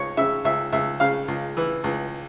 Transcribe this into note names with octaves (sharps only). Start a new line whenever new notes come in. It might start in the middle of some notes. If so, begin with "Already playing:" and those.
Already playing: C#2 C#5
C#3 E5
C#2 E5
C#2 E5
C#3 F5
C#2
E3
C#2